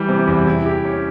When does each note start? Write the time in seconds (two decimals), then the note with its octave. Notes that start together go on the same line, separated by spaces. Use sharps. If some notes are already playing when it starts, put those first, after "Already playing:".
Already playing: E3 G3
0.09 C3
0.27 E2
0.47 E4
0.66 G4
0.85 C#4